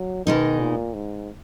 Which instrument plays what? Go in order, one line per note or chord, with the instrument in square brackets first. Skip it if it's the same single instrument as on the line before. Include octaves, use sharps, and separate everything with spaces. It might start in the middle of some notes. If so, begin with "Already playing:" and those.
Already playing: [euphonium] F#3
[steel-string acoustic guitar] B2 G#3 D#4 [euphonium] D#3
[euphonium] A#2
G#2